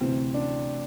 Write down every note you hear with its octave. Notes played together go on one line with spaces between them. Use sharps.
D2 C3 E3 C4
D4